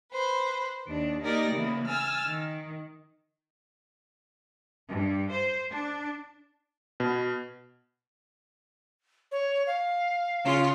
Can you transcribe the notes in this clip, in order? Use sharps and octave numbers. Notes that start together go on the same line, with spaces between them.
B4 C5
D#2 D4
A#3 D#4 G4 A#4 D5 A#6
C#3 E3 A#3 B3
G#5 E6 F6 A6
D#3
G2
C5
D4
B2
C#5
F5
C#3 F4